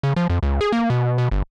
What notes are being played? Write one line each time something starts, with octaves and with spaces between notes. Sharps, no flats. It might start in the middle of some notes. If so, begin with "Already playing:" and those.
C#3
F3
F2
C#2
G#4
A#3
B2
B2
G1